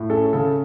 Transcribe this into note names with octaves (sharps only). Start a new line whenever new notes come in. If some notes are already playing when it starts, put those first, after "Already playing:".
Already playing: A2
C#4 A4
C#3 A4